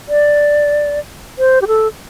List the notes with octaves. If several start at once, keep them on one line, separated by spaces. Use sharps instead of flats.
D5
C5
G4
A4